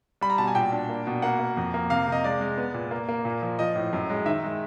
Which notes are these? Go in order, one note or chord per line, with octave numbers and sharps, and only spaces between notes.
G3 B5
A#5
B2 A5
G#5
A#2 G5
D4
A#3
B2
A#3 F#5
A#3
F2
A#3
C3 F5
C3 D#5
G#3 D5
G#3
B3
A#2
A#3
A#3
A#2
F3
F3 D#5
A2
F#2
G#3
D#3 E5
G#3